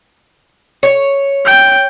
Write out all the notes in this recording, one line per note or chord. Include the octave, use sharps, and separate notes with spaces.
C#5
G5